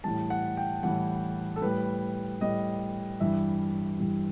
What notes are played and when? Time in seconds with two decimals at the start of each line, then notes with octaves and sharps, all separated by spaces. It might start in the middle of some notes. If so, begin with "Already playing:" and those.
0.04 A2 E3 G3 A5
0.30 F#5
0.57 G5
0.83 A2 E3 G3 F#5
1.56 A4
1.62 A2 G3 B4
2.41 A2 G3 D#5
3.20 G2 E3 G3 E5
4.00 G2 E3 G3